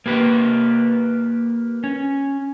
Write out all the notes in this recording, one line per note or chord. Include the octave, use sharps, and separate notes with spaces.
A#3 G4 B4
C#4